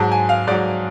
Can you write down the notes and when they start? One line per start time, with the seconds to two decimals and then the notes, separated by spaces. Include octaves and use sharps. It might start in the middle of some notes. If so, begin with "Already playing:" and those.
Already playing: G#2 F#3 A5
0.12 G#5
0.29 F5
0.47 G#2 F#3 D5